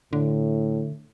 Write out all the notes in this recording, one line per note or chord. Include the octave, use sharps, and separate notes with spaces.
A2 D3